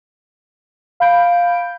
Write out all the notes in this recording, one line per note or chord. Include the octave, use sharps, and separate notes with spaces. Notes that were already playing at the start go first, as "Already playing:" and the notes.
F5 B5 G6 D7